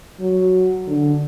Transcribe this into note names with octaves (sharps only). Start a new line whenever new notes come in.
F#3
D3